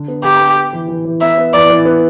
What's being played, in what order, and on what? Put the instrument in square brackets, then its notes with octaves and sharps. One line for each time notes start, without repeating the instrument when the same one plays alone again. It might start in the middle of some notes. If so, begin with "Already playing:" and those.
Already playing: [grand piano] D3
B3
[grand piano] D3 [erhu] G4
[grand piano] B3
G4
E3
E3
E3
[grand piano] B3 [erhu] E5
[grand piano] B3
[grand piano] E3 [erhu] D5
[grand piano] E3
B3